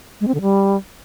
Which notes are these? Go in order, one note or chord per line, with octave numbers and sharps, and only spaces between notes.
G#3
C4
D3
G3